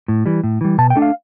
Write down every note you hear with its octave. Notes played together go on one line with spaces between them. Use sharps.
A2
E3 G3
A2
E3 G3
B2 A5
G5
A3 D4
F5